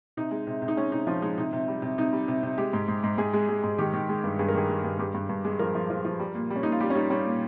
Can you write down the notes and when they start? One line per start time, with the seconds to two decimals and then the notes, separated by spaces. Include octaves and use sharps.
0.17 C3 D#4
0.31 G#3
0.47 C3
0.62 C3
0.68 D#4
0.77 G#3 C#4
0.92 C3 D#4
1.07 F3 C#4
1.22 G#3 D#4
1.38 C3 D#4
1.53 C3
1.68 G3
1.82 C3
1.98 C3 D#4
2.13 G3
2.28 C3
2.43 C3
2.58 G#3 G4
2.73 G#2
2.88 G#2
3.04 G#2
3.18 G#2 G#4
3.34 G#3
3.49 G#3
3.64 G#2
3.78 D#3 G4
3.94 D#3
4.09 G#3
4.24 G2
4.39 G2 G#4
4.48 A#4
4.54 D#3 G#4
4.69 G#3
4.84 G2
4.99 G2 G4
5.14 G2
5.29 G2
5.45 G#3
5.59 F3 A#4
5.75 F3
5.90 F3
6.04 F3
6.20 G3
6.35 A#2
6.50 G3
6.56 C#4
6.63 A#2 D#4
6.72 F4
6.80 G3 G4
6.90 C#4
6.95 G3 D#4
7.10 G3 C#4
7.26 A#2